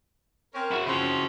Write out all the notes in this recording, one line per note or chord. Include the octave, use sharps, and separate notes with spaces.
C4 C#4 A#4
E4 F#4
C#3 F3 C4 C#4 F#4